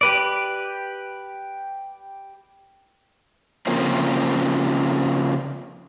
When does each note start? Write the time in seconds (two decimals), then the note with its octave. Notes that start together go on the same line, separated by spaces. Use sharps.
0.01 G4 B4 D5
3.67 C#3 F3 A#3 C4 C#4